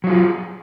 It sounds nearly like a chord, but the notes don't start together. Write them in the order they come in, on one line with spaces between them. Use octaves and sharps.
F#3 F4 G#4